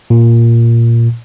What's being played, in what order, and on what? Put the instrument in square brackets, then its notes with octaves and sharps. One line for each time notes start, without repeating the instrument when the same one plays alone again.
[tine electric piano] A#2